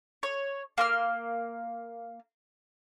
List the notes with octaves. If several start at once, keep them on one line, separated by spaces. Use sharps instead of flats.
C#5
A#3 C6 F6